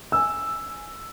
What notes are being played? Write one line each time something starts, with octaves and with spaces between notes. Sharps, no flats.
G#5 E6